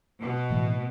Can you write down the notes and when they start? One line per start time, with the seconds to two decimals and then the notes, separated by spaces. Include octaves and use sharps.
0.20 B2
0.50 A2 E3 A3